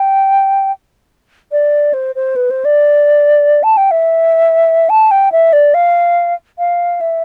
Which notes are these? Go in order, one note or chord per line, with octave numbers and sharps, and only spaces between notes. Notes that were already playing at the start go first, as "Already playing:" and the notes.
Already playing: G5
D5
C5
C5
B4
C5
D5
A5
G5
E5
A5
G5
E5
D5
F5
F5
E5